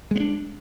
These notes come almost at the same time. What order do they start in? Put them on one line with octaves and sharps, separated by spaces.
G#3 B3 D4